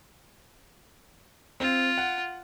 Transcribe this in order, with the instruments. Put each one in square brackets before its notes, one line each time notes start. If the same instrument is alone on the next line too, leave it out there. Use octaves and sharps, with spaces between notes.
[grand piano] C4 [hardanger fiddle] F4
[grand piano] F#5